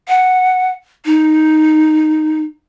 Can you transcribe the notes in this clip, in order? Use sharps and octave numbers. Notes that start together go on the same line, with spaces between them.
F#5
D#4